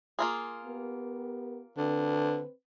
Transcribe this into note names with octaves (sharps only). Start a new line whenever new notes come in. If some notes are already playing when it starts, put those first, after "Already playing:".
A#3 F4 G#4
B3 G4 A#4
D3 C4 B4